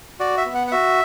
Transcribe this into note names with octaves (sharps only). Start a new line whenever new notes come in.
F#4 D5
E5
B3
F#5
F#5
F#4 E5